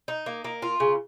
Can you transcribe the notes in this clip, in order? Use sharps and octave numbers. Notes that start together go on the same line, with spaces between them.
D#4
A#3
A#3
F4
C#3